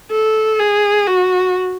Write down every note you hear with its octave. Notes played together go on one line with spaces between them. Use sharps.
A4
G#4
F#4